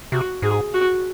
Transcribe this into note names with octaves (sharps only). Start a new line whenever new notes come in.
C3 F#4
G#2 G#4
F#4